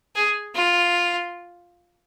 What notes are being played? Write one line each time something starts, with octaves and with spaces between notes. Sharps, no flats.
G#4
F4